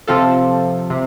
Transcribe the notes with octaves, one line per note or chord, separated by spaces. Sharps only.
C3 F3 C4 F4 A4
C3